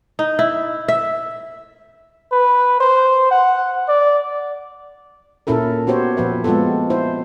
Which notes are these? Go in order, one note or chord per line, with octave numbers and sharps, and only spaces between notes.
D#4
E4
E5
B4
C5
F#5
D5
A#2 C#4 E4 A4 A#4
B3 F#4 G4 C5 C#5
A#2 F3 B4 E5
G#3 B3 C4 F4 A4
E4 C5